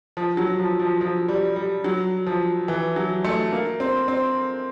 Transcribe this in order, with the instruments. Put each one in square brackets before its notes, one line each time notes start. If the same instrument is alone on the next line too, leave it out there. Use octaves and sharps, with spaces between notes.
[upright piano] F3
F#3
F3
F3
F3
G3
G3
F#3
F3
E3
F#3
A3
A#3
C4
C4